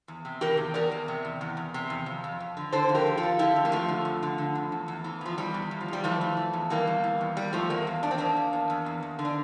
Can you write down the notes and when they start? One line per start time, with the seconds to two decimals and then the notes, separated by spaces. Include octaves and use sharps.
0.08 E2
0.25 C3
0.41 E3 G4 A#4
0.57 E2
0.74 E2 A#4 D5
0.91 E2
1.08 C3
1.25 E2
1.41 E2
1.57 E2
1.74 C3
1.90 E2
2.06 F2
2.24 F2
2.40 F2
2.57 D3
2.72 D3 A4 C5
2.89 F2
2.94 G4 A#4
3.07 F2
3.17 F4 A4
3.23 F3
3.39 D3 E4 G4
3.56 F2
3.65 A#3
3.72 F2 F3 A3
3.88 D3
4.05 F2
4.23 D3
4.38 D3
4.55 F2
4.72 E2
4.88 E2
5.04 E3
5.21 E2 F3
5.38 E3 G3
5.54 E2
5.71 E2
5.81 F3
5.88 E2 G3
6.04 E3 F3 A3
6.21 E3
6.37 E3
6.53 E2
6.70 E3 G3 A#3
6.87 E2
7.04 E3
7.21 E2
7.37 E2 G3
7.53 E2 F3 A3
7.70 E2 G3 A#3
7.87 E2
8.03 E2 D4
8.11 C4
8.18 E2 A#3 D4
8.37 E2
8.53 E2
8.70 E2
8.86 E2
9.03 E2
9.19 D3
9.25 D4